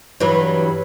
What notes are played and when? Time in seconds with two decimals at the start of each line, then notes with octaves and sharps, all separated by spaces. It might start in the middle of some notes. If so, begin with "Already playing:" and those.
0.20 G2 E3 F#3